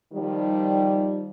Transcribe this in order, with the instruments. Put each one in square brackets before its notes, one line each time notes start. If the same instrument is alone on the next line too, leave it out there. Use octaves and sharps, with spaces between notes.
[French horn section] D#3 F3 G3